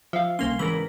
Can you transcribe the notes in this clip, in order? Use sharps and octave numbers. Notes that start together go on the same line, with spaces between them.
F3 E5 F5
C2 A#3 C#4 C6
G#2 C#3 E3 A#4 B5